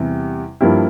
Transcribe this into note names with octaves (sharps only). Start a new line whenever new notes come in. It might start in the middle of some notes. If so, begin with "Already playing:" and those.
Already playing: E2 C3 G3
G2 F3 A#3 E4 G4